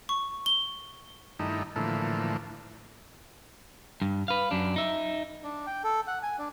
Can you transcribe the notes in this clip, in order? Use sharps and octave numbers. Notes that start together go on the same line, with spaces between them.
C#6
G7
G2 D#3 A3 D#4 E4
A2 D3 E3 F3 A3 A#3
G2
B4 F5
F#2 D4
D#4 E5
D4
G5
A4
F#5
G#5
D4